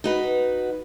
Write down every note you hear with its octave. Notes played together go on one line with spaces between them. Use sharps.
D#4 F#4 B4